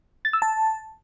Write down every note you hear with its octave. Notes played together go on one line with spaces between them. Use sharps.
A6
E6
A5